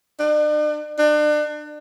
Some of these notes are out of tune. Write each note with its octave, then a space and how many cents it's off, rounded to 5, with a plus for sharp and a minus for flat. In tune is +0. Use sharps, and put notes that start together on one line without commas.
D4 +45
D4 +35